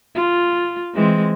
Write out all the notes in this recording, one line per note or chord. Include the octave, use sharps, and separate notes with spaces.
F4
E3 G#3 C4